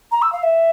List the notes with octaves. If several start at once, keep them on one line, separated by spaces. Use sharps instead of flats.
A#5
E6
F5
E5